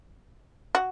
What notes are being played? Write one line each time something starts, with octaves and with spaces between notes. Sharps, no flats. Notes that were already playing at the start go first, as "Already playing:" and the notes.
F#4